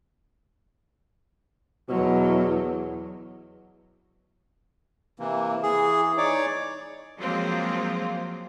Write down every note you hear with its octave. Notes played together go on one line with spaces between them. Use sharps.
E2 B2 F#3
C3 E3 A#3
E3 G#4
D#4 C#5 D5 D6
F3 F#3 G#3 A#3 C4 F4